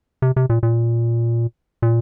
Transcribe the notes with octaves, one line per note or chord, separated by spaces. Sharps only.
C3
C3
A#2
A#2
A#2